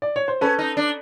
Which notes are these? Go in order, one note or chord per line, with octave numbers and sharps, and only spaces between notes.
D5
C#5
C5
C#4 A4 B4
D#4
D4